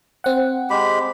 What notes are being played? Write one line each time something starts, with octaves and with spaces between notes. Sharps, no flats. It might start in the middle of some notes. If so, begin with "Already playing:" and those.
C4 F#5
G#3 G4 B5